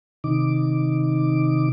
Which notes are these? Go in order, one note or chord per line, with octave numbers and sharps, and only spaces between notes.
C3 D#3 D#4 D6